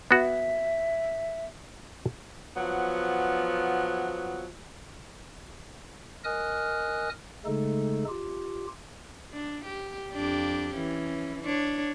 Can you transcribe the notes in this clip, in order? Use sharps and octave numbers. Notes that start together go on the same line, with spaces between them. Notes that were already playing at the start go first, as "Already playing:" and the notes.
B3 F#4 E5
F3 F#3 B3
A#4 D#5 G#5 D#6 F6 F#6
C#3 G#3 A3 D#4 A4
F4 G4
D4
G4
F2 D4 G4
E3 C#4
D4 C#5